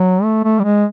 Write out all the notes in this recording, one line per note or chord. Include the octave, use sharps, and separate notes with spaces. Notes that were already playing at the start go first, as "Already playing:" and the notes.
Already playing: F#3
A3
A3
G3
G#3